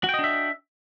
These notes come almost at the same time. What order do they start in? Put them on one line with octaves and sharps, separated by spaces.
F#4 G5 D#5 D4 E5